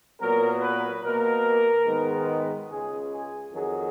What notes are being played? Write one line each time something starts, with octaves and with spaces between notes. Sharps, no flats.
A#2 F#3 B3 A#4
B4
B2 A#3 A#4
G#2 D#3 G#3 B3
C#2 C#3 G#3 G#4
G#4
F2 D#3 F#3 G#4